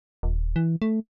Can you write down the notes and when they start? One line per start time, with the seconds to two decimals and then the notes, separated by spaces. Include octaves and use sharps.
0.23 D#1
0.56 E3
0.82 A3